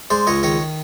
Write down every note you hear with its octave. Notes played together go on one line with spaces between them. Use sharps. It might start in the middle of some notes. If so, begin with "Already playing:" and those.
G#3 C5 D5
C#2 C#5 D#5
D#3 C#5 D#5